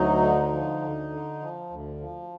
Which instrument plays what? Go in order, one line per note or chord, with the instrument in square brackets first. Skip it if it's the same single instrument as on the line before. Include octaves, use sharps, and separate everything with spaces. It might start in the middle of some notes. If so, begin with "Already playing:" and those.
Already playing: [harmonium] D2 F#3 D#4
D3
F3
D2
D3
F3
D2
F3